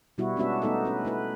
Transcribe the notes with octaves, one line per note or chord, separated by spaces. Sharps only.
B2 G3 B3 E4 F#4
G#3 B3 C#4 D4 F#4 E5
A3 B3 D#4 A4 E5
C#4 B4
A3 E4 B4